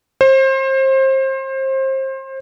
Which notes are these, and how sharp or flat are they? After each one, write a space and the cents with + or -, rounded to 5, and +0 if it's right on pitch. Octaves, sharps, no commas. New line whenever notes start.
C5 +30